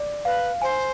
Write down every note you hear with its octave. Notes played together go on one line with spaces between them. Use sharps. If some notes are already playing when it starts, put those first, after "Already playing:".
Already playing: D5
B4 F5
C5 G#5